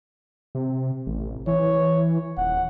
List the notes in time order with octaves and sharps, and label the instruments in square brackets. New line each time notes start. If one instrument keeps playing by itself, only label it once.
[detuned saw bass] C3
A1
[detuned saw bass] E3 [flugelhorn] C#5
[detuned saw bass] D#1 [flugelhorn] F#5